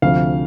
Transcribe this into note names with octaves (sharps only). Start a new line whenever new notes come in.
D2 C3 F3 F5